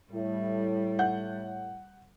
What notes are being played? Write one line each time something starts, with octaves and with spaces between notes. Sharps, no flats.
A2 G3
F#5 G6